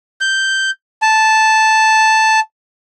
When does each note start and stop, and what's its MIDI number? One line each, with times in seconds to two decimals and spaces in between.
0.21 0.70 91
1.02 2.40 81